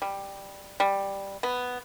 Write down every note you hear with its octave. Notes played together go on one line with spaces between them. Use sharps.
G3
G3
B3